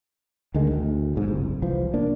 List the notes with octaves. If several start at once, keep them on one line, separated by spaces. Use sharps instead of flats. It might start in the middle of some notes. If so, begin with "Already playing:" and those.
D2 D3 D#3 G#3
D2
B1 G#2
F#1 C2
C2 E3 F3
A#3 D4